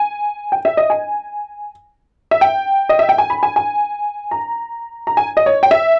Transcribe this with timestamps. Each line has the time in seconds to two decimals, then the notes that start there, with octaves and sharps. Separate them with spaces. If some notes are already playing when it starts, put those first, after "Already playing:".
Already playing: G#5
0.52 G5
0.65 E5
0.77 D#5
0.90 G#5
2.31 E5
2.41 G5
2.89 D#5
2.99 E5
3.09 G5
3.18 G#5
3.30 B5
3.43 G#5
3.56 G#5
4.31 A#5
5.07 A#5
5.17 G#5
5.37 D#5
5.46 C#5
5.63 G5
5.71 E5